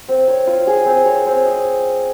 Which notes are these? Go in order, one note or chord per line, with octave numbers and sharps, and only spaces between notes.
C4
C#5
F4
G#4
C4
C#5
C4
D#5